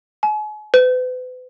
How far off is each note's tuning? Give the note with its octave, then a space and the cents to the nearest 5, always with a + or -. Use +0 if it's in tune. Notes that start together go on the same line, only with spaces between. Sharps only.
G#5 +40
B4 +40